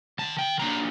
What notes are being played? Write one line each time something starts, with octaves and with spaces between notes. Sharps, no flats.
D#3 A5
G5
F#3 A#3 D4 A#5